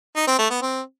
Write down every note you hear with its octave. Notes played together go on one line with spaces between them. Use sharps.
D#4
C4
A3
B3
C4